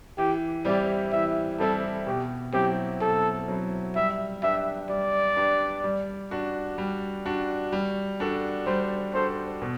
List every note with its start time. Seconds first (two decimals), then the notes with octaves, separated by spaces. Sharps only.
0.18 E3 G4
0.65 G3 C4 E4 G4 D5
1.12 E3 E5
1.59 G3 C4 E4 G4 A4
2.07 B2 G4
2.53 F#3 C4 E4 G4
3.01 B2 A4
3.48 F#3 C4 E4
3.95 G3 E5
4.43 D4 G4 B4 E5
4.89 G3 D5
5.36 D4 G4 B4
5.84 G3
6.31 D4 F#4
6.78 G3
7.26 D4 F#4
7.72 G3
8.20 D4 F#4 A4
8.67 G3 C5
9.13 D4 F#4 A4 C5
9.62 B2